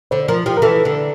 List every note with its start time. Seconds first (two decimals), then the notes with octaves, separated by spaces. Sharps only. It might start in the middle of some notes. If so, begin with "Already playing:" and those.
0.11 D3 C5
0.28 F3 A#4
0.46 F3 G4
0.57 A#4
0.62 E3 A4
0.85 D3